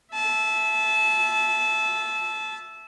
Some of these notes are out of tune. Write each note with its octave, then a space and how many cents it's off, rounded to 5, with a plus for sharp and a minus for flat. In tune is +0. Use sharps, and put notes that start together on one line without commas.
E5 +5 A5 -25